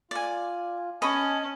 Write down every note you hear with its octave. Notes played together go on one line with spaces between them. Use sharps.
F4 D5 G#5
C#4 D#5 G#5 A5 B5 C#6